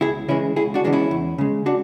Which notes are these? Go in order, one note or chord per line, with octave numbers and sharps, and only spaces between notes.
C#2 E4 G#4
C#3 E3 G#3 C#4 E4
C#2 E4 G#4
D4 F#4
C#3 E3 G#3 D4
C#4 E4
E2
C#3 G#3
D4 F#4